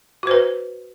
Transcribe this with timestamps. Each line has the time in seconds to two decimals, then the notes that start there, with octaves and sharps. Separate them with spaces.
0.23 F#4
0.27 C5
0.31 B4